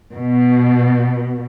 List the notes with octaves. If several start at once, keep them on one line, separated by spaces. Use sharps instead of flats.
B2